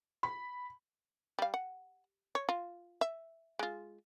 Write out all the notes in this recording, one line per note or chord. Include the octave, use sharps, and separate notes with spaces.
B5
G3 F5
F#5
C#5
F4
E5
G#3 F4